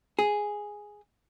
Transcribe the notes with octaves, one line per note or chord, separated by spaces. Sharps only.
G#4